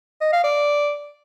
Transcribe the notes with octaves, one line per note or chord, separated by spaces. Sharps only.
D#5
F5
D5